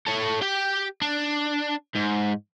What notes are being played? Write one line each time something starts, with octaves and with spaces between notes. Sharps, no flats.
A4 C#5
G4 G5
D4
G#2